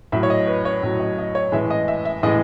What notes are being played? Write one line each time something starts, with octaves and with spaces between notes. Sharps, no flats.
A2 F#3 E5
C#5
D#5
B4
C#5
A2 F#3
D#5
D#5
C#5
A2 E3 G#3 E5
D#5
E5
E5
A2 E3 G#3 D#5